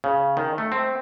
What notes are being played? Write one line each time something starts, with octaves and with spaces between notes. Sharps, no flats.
C#3
D#3
A3
C4